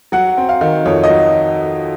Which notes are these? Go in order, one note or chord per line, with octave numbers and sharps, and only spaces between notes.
F#3 F#5
C4
F5
D#3
F2 C#5
D#5
F#3